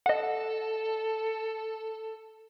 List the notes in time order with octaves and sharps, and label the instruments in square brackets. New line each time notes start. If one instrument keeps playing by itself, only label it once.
[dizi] A4 [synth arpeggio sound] D#5 F#5